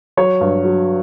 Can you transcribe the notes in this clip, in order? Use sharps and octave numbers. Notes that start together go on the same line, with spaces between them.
F#3 C#5
G2
F#3